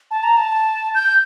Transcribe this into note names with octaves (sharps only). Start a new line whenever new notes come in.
A5
A#5
A5
G6